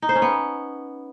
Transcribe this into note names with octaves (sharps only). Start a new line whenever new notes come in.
D#4
C5
C#4
B3